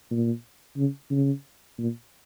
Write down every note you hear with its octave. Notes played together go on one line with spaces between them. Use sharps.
A#2
C#3
C#3
A#2